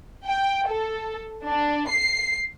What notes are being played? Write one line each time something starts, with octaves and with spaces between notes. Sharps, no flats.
G5
A4
D4
C7